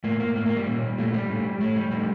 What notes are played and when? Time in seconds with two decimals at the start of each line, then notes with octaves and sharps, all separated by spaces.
0.04 A2 A#3
0.20 A#3
0.36 A2 A#3
0.46 A#3
0.57 G3
0.67 A#2
0.98 A#2 A3
1.14 G3
1.29 A2
1.60 A2 A3
1.76 G3
1.91 A2 G3